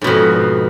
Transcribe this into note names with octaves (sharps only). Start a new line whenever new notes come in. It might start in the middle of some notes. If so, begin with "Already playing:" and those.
F2 G#2 B2